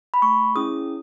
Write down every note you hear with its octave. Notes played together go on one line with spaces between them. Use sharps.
B5
A3 C#6
C#4 E4 G#4 D#6